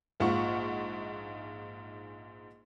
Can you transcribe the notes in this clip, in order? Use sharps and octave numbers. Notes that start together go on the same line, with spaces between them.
A#1 G#2 F4 F#5 C#6